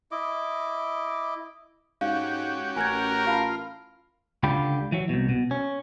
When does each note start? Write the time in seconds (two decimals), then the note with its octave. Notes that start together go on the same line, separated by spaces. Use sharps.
0.11 E4 D#5 D6
2.01 G#2 C#4 F#4 G4 F5
2.77 A1 A#4 G#5 F#6 G#6
3.27 F4 F5 A5 B5
4.43 C#2 D3 F4 G4 B5
4.92 E3 F#3
5.09 C2 B2
5.29 B2
5.51 C#4